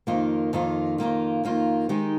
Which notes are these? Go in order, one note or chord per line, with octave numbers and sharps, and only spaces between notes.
F2 D#3 A#3 F4
F2 D#3 A#3 F4
F2 D#3 A#3 F4
F2 D#3 A#3 F4
D#3 G#3 D#4 G4